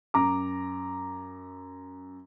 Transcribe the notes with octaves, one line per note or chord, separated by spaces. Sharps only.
F#2 A#5 D6